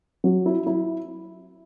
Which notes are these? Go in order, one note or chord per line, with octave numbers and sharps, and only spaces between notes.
F#3
E4
E4